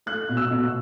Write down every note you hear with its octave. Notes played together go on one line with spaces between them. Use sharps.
A3 F#6
B2
E6
B2